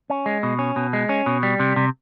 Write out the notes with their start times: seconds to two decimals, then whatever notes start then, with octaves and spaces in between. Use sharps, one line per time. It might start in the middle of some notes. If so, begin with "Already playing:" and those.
0.10 C#4
0.26 G#3
0.43 B2
0.59 C#4
0.76 B2
0.93 G#3
1.09 C#4
1.26 B2
1.43 G3
1.60 C3
1.76 C3